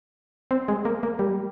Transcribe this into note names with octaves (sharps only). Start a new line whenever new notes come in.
C4
G#3
A#3
A#3
G3